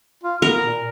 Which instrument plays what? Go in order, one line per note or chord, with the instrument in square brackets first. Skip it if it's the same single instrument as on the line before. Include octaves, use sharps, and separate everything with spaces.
[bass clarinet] F4
[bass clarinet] B3 [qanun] A#4
[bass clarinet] A#2